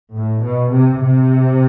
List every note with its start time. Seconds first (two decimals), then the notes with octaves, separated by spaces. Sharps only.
0.15 A2
0.44 B2
0.72 C3
1.02 C3